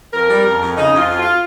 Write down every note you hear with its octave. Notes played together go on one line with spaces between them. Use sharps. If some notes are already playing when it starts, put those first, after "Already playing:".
F2 A#4
G3
F2
F2
C#3 D#4
F2
F4
F2
F4